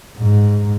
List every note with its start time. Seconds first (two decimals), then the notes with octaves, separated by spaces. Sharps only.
0.17 G#2